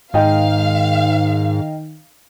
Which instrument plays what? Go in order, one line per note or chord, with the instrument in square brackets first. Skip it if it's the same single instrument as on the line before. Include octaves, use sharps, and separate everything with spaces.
[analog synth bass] G#2 [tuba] D#3 [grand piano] D#4 D#5 G5 [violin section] F5